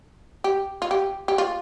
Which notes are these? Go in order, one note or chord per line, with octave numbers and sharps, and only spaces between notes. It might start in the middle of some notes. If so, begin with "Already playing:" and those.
G4
F4
G4
G4
F4